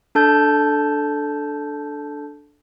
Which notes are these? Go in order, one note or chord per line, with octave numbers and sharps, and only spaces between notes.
D4 A4 A5 G6